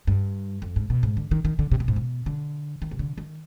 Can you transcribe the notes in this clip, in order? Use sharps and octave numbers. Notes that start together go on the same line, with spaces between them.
G2
F2
G#2
B2
G#2
D3
D#3
D#3
D3
C3
B2
G#2
B2
D3
D#3
C3
D3
D#3